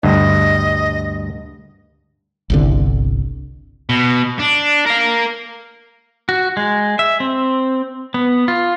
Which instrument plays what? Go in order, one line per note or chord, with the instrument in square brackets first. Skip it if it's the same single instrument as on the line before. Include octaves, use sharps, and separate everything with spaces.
[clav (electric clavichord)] D2 G2 [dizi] D#5
[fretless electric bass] G1 C2 D3
[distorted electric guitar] B2
D4
A#4 F5
[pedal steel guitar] F#4
G#3
E5
C4
B3
F4